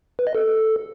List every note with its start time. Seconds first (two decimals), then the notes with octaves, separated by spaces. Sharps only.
0.19 B4
0.27 D#5
0.35 A4